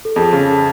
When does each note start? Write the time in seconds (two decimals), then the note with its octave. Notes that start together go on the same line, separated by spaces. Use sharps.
0.05 A4
0.16 F2 G#4
0.33 C#3